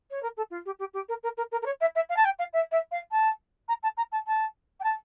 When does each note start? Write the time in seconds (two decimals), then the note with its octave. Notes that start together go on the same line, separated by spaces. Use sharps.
0.10 C#5
0.22 A#4
0.37 A4
0.50 F4
0.65 G4
0.79 G4
0.93 G4
1.08 A#4
1.23 A#4
1.37 A#4
1.51 A#4
1.62 A#4
1.65 C#5
1.80 E5
1.95 E5
2.09 F5
2.16 A5
2.24 G5
2.39 F5
2.53 E5
2.71 E5
2.91 F5
3.11 A5
3.68 A#5
3.83 A5
3.97 A#5
4.12 A5
4.27 A5
4.80 G5
4.83 A5